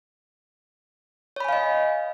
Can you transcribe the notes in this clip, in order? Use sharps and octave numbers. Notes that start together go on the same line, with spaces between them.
C#5 D#5 F5 G#5 B5